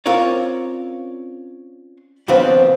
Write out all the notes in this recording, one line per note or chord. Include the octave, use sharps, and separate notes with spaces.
C4 C#4 F4 A#4 C#5 D5
D#2 C#3 F3 B3 C4 D4